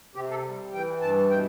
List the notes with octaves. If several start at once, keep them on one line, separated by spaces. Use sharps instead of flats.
C3 G4
A4
G3
E3 G5
G2 A5
B2 G5